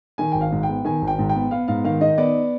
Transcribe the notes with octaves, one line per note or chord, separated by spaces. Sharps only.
D#3 G#5
G#1 G5
F5
G#2
G5
B3
D#3 G#5
G#1
G5
G#2
G5
B3
B3 F5
G#2 F5
D#3 F5
D#4 D#5
B3 D5